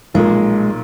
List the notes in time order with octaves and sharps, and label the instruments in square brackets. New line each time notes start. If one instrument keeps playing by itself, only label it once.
[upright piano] B1 A#2 F3 A#3 [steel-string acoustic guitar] G#3